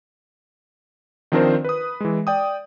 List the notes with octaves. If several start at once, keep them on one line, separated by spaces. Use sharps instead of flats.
D#3 F3 C4 D4 A#4 C5
B4 D#6
E3 G#3
D5 G5 D#6